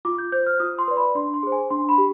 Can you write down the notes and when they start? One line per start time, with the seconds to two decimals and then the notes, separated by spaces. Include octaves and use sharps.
0.05 F4 D6
0.18 G6
0.32 C5 G6
0.47 F6
0.60 F4 D#6
0.79 C6
0.88 B4 D5
0.97 B5
1.15 D4 C6
1.34 C6
1.43 G#4 C5
1.52 G#5
1.70 D4 C6
1.89 B5
1.98 G4